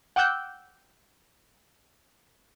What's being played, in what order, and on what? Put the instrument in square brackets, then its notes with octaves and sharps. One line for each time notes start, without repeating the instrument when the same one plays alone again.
[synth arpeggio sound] F#5 G5 D6 E6 F#6 G6